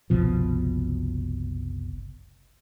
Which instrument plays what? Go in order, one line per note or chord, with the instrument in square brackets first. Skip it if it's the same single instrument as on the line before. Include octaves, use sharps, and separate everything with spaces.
[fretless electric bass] F#1 C2 B2 F3